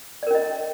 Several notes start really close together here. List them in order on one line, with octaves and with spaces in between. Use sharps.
D5 A#4 C#4 D#5